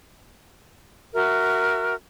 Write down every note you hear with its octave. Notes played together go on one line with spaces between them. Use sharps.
F#4 A#4 E5